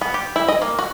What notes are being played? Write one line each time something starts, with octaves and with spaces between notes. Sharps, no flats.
B3
G4
E4
D#5
A#3
F#4